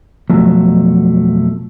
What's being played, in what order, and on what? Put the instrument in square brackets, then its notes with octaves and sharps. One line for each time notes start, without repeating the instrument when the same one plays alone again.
[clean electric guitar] F2 B2 F3 F#3 A3